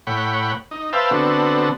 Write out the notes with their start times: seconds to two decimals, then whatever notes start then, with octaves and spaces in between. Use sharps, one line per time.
0.07 A2 C#5 F#5 G5 B5
0.71 D#4
0.93 B4 C5 E5 F5 G5 A5
1.11 D3 B3 C4 F#4 A4